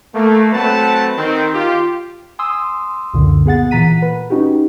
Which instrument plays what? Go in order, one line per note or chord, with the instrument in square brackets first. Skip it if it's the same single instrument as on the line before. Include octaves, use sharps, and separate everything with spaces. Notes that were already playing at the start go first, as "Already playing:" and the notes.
[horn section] A3 A#3
F#3 A3 C4 B4 F#5 A5
D#3 C4
F4 G4
[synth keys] G#5 C6 D#6 E6
C#2 F#2 A#2 D3
B3 G#4 F#5 A6
A#2 E3 F#5 A#5 B6 D#7
B4
C#4 D#4 F#4 G4